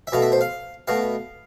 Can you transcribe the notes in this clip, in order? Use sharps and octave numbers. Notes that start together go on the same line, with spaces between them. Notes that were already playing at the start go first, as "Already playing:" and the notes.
E5
B2 A3 F5
E5
C5
F5
B2 A3 F5